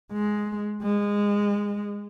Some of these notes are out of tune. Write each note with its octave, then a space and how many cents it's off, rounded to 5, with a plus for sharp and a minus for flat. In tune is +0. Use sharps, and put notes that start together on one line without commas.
G#3 +10
G#3 -20